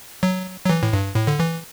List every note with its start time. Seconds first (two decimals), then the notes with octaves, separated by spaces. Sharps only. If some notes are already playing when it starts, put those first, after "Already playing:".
0.23 F#3
0.65 F#3
0.69 E3
0.83 A2
0.93 G2
1.16 A2
1.27 D3
1.40 E3